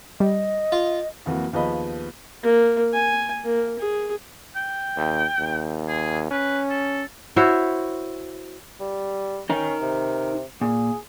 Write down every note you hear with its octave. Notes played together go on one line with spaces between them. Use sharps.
G3 D#5
F4
F2 E3 F#3 A#3
D#2 F3 B3 G#4 D#5 B5
A#3
G#5
A#3
G#4
G5
D#2
D#2
G#4
C#4 B4
A4
E4 F#4 C5 C#5
G3
C#4 D#4 A#4
C3
A#2 G#4